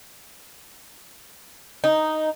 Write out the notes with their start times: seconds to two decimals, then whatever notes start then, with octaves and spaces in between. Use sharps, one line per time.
1.84 D#4